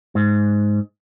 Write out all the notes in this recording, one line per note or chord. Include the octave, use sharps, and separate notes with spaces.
G#2